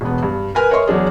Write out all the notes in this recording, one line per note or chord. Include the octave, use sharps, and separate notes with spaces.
E1 B3
G2
A#4 B4 G#5 F6
A#4 C#5 D#5 E5 C6 C#6
E2 F#3 D4 G#4